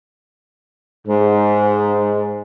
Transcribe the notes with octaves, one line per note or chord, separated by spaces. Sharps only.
G#2